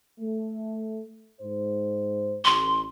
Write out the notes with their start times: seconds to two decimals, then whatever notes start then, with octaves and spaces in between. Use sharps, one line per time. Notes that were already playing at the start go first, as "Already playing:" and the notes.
0.20 A3
1.41 G#2 C5
2.45 A1 C6